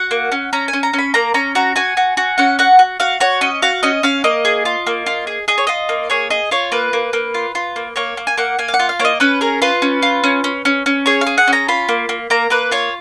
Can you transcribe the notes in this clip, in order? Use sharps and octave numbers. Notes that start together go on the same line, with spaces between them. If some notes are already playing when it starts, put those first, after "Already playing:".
Already playing: F#4 F#5
A#3
C#4
C#4 A#5
G#5
C#4
A#5
C#4
B5
A#3 A#5
C#4 A#5
F#4 A#5
F#4 G#5
F#4
F#4
C#4 F#5
F#4 F#5
F#4
F#4 F5
F#4 C#5
C#4 D#5
F#4 F5
C#4 D#5
C#4 F5
A#3 D#5
G#4
F4
A#3
F4
G#4
G#4 D#5
C#5
F4 D#5
A#3
G#4 C#5
G#4 D#5
F4 C#5
A#3 B4
A#3
A#3
F4
F4
A#3
A#3 C#5
A#3
G#5
A#3 F#5
A#3 G#5
F5
F#5
F4
F5
A#3 C#5
D#5
C#4 B4
G#4 A#4
F4 B4
C#4
F4
C#4
C#4
C#4
C#4
G#4 C#5
F5
G#4
F#5
C#4
A#5
F4 B5
A#3
A#3
A#3 A#5
A#3 B4
F4 C#5